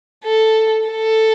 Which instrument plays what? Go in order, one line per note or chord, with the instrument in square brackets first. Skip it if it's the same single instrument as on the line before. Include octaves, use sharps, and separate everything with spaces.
[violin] A4
A4